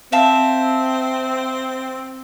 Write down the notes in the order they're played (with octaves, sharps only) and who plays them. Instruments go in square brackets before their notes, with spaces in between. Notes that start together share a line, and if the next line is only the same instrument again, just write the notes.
[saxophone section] C4 [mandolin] E5 F5 A5